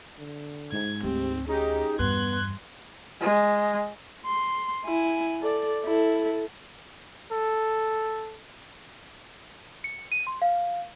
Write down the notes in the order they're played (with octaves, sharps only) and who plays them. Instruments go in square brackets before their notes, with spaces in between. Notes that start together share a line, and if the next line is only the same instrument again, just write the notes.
[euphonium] D3
[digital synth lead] G#2 [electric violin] G#6
[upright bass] D2 [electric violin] C4 [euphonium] G4
[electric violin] C#4 G4 [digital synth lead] D#4 [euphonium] G#4
[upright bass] E2 G2 [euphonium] B3 [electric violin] C6 G#6 [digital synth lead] F#6
[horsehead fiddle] G#3
[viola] C6
E4 G#5
A4 D5
E4 A4
[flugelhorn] A4
[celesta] C#7
D#7
C6
F5